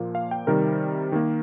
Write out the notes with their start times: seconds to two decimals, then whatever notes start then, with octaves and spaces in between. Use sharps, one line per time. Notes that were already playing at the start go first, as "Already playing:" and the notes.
Already playing: A#2 F3 A#3
0.15 F5
0.31 G5
0.47 C3 D#3 G3 A#4
1.12 D#3 A#3